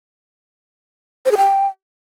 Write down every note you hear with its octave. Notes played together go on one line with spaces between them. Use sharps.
C5
G#4
G5